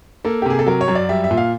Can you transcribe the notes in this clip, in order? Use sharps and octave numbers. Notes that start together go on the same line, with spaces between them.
A#3 A4
G4
C3 G#4
A4
F#3 A#4
C#5
F#2
D5
G3 E5
E5
A#2
F5